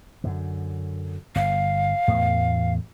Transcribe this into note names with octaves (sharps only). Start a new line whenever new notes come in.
F#2 D3
G1 F5
E2 A2 A3